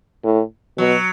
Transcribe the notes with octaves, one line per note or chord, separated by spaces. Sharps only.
A2
B2 F#3